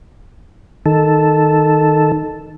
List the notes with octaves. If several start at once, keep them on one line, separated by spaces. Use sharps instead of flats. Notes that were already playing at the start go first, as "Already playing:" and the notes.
D#3 A4